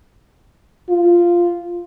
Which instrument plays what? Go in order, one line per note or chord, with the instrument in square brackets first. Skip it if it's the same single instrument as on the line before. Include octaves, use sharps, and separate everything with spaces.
[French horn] F4